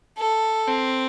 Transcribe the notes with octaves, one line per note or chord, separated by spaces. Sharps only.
A4
C4